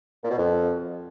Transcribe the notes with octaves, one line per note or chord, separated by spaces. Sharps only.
A#2
B2
F2